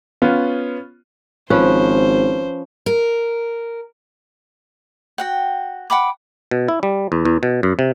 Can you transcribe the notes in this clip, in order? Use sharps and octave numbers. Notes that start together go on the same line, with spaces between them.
B3 C#4 F4
G#1 F3 C#4 B4 C5
A#4
F#4 F#5 G5
F#5 G5 B5 D6
B2
E4
G3
E2
E2
B2
F#2
C3